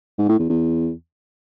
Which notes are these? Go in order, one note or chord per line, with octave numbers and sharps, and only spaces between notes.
G#2
A2
E2
E2